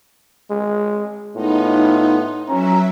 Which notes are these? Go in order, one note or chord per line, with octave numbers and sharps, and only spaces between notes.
G#3
A2 B3 D#4 F4
F#3 C#4 E5 A#5